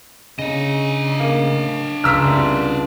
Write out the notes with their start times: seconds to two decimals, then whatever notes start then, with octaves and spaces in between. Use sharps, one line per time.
0.39 C#3 D4 D#5
1.20 A#3 C#7 D#7
2.04 C#2 A#5 C6 E6 F6 B6
2.24 C2